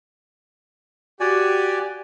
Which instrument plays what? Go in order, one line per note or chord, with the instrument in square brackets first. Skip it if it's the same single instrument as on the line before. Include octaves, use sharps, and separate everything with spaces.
[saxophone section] F#4 [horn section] G4 [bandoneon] D5 G#5